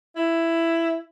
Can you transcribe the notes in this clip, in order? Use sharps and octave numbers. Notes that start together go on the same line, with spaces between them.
E4